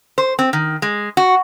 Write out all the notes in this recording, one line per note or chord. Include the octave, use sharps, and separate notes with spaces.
C5
C4
D#3
G#3
F#4